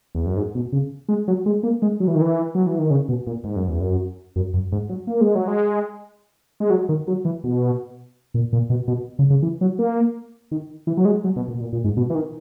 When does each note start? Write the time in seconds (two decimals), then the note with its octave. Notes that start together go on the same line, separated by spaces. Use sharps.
0.15 E2
0.26 F#2
0.37 G#2
0.55 B2
0.72 C#3
1.09 G#3
1.28 F#3
1.46 G#3
1.63 A#3
1.82 G#3
2.00 F#3
2.08 E3
2.15 D#3
2.21 E3
2.55 F#3
2.67 E3
2.79 D#3
2.90 C#3
3.09 B2
3.27 A#2
3.44 G#2
3.56 F#2
3.68 E2
3.80 F#2
4.36 F#2
4.54 F#2
4.72 G#2
4.89 F#3
5.07 A#3
5.21 G#3
5.35 F#3
5.48 G#3
6.60 G#3
6.70 F#3
6.89 D#3
7.08 F#3
7.25 E3
7.44 B2
8.34 A#2
8.53 A#2
8.70 B2
8.88 B2
9.19 C#3
9.30 C#3
9.42 E3
9.61 F#3
9.79 A#3
10.51 D#3
10.87 E3
10.97 F#3
11.05 G#3
11.24 F#3
11.36 B2
11.48 A#2
11.55 B2
11.61 A#2
11.73 A#2
11.84 G#2
11.97 B2
12.10 E3
12.15 D#3